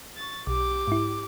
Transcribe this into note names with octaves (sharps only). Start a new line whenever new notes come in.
C#6 A6
B1 G4 D6
G#2 E4